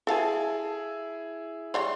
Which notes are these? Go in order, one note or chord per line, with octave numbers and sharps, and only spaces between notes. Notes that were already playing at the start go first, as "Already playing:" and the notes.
E4 G#4 A4 F5 A5
E3 G3 C#5 C6